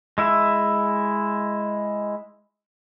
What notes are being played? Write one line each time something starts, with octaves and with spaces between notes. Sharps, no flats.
G#3 E4 E5